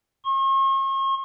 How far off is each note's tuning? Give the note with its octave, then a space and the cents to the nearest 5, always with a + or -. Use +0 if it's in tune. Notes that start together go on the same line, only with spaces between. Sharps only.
C#6 -45